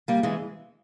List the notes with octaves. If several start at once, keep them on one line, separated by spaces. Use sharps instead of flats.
G3 A#3
E3 G#3